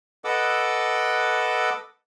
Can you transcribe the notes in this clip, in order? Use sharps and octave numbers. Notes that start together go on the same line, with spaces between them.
A4 B4 D#5 F#5 D6 E6